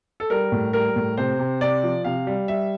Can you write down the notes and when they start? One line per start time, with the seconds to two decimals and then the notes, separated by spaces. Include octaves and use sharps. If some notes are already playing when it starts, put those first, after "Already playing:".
0.20 A4
0.30 G3 A#4
0.52 A2
0.73 G3 A#4
0.96 A2
1.17 C3 C5
1.39 C3
1.61 C3 D5
1.83 F3
2.05 C3 F5
2.27 G3
2.48 G3 E5